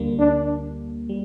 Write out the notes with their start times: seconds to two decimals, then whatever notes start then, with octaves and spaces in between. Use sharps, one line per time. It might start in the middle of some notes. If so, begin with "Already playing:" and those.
Already playing: D2 D3 G3 A#3
0.19 D4
1.09 G3